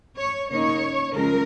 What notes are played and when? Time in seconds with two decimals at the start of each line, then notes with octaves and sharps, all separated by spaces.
0.18 C#5
0.50 C#3 A#3 D#4 C#5
1.13 C#3 F3 G#3 A#4